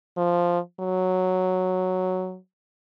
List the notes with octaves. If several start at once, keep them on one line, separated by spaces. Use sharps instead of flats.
F3
F#3